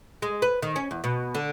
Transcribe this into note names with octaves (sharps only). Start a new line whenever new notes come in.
G#3
B4
D#3
C#4
E2
B2
D3